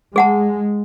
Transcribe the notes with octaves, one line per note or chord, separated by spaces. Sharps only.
G#3 G#4 F#5 A5